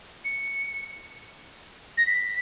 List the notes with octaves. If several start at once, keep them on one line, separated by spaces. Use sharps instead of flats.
C#7
A#6
B6